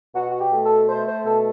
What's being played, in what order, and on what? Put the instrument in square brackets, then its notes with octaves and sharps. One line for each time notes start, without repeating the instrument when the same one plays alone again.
[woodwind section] B2 F#4
F#4
G4
A3
A4
A3 C5
C5
B2 A4